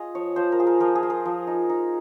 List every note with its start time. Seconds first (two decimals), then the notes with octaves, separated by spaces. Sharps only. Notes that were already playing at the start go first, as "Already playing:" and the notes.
Already playing: F4 G#4 D#5
0.15 F3 C#5
0.36 F3 C5
0.52 A#4
0.59 F4 G#4
0.67 A#4
0.80 F3 A#4
0.95 G#4
1.03 F4
1.10 A#4
1.25 F3
1.47 D#4
1.69 D#4